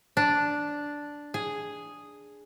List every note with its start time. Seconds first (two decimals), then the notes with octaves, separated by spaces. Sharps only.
0.17 D4
1.34 G#4